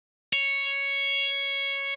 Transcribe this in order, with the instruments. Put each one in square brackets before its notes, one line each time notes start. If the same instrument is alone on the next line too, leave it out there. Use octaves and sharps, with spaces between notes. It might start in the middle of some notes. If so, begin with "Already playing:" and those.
[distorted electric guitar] C#5